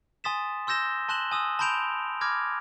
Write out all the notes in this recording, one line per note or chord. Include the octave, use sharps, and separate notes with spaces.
G#5 C6 D#6 A6 B6 E7
C6 E6 G6 A#6 E7 G7
A5 C6 F#6 E7 F#7 G7
G#5 D#6 E6
A5 B5 C6 G6 D7 F7
B5 D6 F6 G#6 A#6